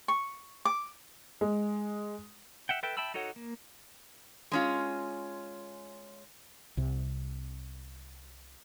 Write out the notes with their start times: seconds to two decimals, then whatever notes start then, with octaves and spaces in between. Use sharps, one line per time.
0.08 C#6
0.65 D6
1.41 G#3
2.69 E5 F#5 G5
2.83 A4 B4 E5 G5
2.97 E5 G5 A5 B5 E6
3.14 D#4 F#4 A4 C#5 F#5
3.36 A#3
4.52 G#3 C#4 F4
6.77 C2 C3